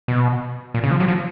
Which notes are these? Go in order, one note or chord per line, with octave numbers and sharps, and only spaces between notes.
B2
A#2
C#3
F3
F#3
F3